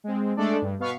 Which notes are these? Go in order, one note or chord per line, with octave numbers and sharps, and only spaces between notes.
G#3 C4
G#3 A3 D4 A4 D5
G2
B2 B3 F5 C#6 B6